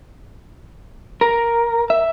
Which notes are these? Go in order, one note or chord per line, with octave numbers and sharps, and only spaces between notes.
A#4
E5